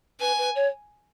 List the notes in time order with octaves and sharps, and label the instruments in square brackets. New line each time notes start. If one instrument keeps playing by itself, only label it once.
[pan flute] B4 [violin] G#5
[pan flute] B4
C#5